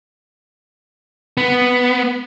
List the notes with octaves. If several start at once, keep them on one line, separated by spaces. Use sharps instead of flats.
B3